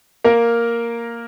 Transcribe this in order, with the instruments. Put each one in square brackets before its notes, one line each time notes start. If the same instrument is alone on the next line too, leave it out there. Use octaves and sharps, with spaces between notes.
[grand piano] A#3 A#4